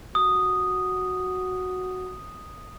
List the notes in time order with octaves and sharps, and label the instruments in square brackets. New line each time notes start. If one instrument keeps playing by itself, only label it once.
[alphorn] F#4 [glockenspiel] D#6